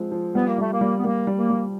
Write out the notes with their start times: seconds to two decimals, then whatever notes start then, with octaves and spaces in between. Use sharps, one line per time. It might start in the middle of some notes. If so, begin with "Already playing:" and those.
Already playing: F3 G#3 C4
0.12 F3
0.35 G3 B3
0.47 A#3
0.58 G3 A3
0.72 A#3
0.81 G3
1.00 B3
1.03 G3 A#3
1.27 G3
1.38 A#3
1.50 G3